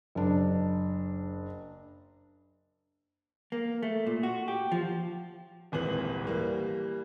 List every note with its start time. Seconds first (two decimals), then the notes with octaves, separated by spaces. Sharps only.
0.15 F#1 D4
3.52 A#3
3.83 A3
4.07 A#2
4.23 F#4
4.48 G4
4.72 F3
5.72 D#1 G#1 E3 F#7
6.27 E3 G3 A#3